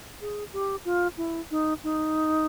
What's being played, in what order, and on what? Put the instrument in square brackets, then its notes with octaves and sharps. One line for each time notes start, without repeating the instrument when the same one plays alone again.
[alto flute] G#4
G4
F4
E4
D#4
D#4